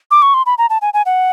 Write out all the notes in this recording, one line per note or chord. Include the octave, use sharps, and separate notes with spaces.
D6
C#6
C6
B5
A#5
A5
G#5
G#5
F#5